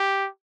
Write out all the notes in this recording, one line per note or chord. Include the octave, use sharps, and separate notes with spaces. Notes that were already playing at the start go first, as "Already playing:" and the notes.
Already playing: G4